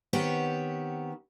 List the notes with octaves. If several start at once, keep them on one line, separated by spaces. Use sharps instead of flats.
D#3 B3 C4 F#4 G4 C#5